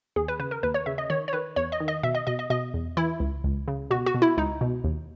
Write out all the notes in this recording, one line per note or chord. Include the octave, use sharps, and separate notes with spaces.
D#2 G#4
B4
C#3 B4
A#4
D#2 B4
C#5
C#3 E5
D#5
D#3 C#5
C#5
D#3 B4
E2 C#5
D#5
D#3
D#5
B2 E5
D#5
B2 D#5
D#5
B2 D#5
E2
E3 E4
C#2
C#2
C#3
B2 F#4
F#4
B2
E4
C#2 D#4
B2
D#2